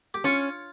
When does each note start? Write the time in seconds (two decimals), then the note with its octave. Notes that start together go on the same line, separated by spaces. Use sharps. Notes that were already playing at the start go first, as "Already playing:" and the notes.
0.14 G4
0.24 C#4 F4